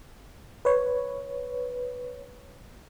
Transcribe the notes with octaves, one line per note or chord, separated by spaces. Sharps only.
B4 C#5